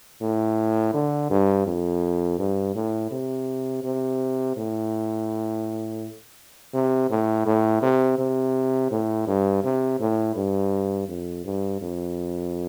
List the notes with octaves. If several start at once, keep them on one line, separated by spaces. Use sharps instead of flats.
A2
D3
G2
F2
G2
A2
C3
C3
A2
C3
A2
A2
C3
C3
A2
G2
C3
A2
G2
F2
G2
F2